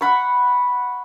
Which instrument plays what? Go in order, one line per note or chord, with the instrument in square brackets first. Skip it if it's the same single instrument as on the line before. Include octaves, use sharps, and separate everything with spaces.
[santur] F#5 B5 C#6